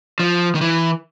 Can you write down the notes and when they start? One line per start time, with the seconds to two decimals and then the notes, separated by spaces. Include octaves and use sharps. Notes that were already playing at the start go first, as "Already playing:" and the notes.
0.19 F3
0.55 D#3
0.61 E3